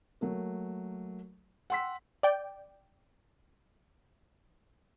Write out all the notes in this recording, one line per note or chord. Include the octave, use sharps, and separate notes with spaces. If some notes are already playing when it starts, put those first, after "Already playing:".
F#3 A3 A#3
F#5 G5 C6 E6 B6
D5 G5